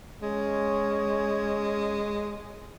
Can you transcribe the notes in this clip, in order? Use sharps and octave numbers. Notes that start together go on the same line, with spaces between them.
G#3 C#4